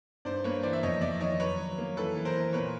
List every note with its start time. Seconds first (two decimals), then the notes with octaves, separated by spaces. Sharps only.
0.25 G2 C5 D5
0.44 A#3 B4 C#5
0.63 E3 C5 D5
0.73 E5
0.83 F2 C#5 D#5
1.01 F2 D5 E5
1.20 D#3 C#5 D#5
1.40 F#3 B4 C#5
1.58 F#3
1.78 A#3
1.97 E3 A4 B4
2.15 E3
2.25 A#4 C5
2.34 E3
2.53 A#2 B4 C#5